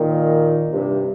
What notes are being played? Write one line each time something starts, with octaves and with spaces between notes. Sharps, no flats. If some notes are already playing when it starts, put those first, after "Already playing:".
Already playing: A#2 D#3
G2 C3